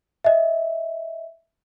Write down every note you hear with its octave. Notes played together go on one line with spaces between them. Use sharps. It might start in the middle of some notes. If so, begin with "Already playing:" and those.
D#5 E5